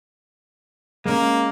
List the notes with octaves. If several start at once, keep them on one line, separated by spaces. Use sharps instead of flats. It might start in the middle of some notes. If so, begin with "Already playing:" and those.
G#3 A#3 C#4